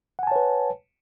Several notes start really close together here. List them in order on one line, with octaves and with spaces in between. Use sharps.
F#5 G#5 A5 C#5 B4